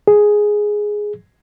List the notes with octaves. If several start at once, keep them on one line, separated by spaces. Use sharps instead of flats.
G#4